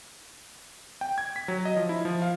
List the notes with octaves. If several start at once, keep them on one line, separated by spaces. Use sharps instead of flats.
G5
G#6
B6
F#3
D#5
F3
E4
F3
F5